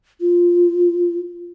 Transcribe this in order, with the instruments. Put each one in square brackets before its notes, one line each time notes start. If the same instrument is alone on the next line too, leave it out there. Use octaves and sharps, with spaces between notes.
[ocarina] F4